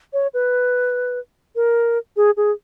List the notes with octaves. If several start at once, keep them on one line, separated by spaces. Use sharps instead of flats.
C#5
B4
A#4
G#4
G#4